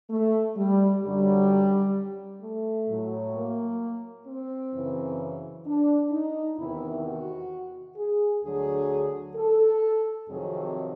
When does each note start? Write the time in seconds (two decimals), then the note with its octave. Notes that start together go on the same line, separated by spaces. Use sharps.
0.10 A3
0.57 G3
1.03 F#2 D3 F#3 G3
2.42 A3
2.88 A2 F#3
3.35 A#3
4.27 C4
4.73 F#2 C#3 E3
5.66 D4
6.12 D#4
6.58 E2 C3 D#3 E4
7.05 F#4
7.97 G#4
8.43 D2 D3 F#3 G#4
9.36 A4
10.28 F2 C3 D#3 F#3 G#4